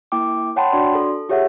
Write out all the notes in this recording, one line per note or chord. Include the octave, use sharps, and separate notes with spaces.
A#3 E4 G5 D6
C#5 F#5 G5 A5 B5 C6
D4 F#4 D5 C6
A4
F4 G4 G#4 C#5 E5 F#5